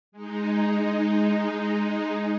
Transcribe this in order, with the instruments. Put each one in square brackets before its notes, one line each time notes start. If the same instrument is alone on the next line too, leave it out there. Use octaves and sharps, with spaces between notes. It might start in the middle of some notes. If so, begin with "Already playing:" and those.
[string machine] G#3 D#4